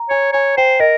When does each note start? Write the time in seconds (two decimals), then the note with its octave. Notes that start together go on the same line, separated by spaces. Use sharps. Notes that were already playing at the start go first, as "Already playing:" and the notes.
Already playing: A#5
0.10 C#5 G#5
0.33 C#5 G#5
0.57 C5 G5
0.80 A#4 D#5